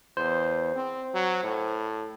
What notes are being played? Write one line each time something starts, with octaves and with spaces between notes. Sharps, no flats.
E2 C5
C4
F#3
A2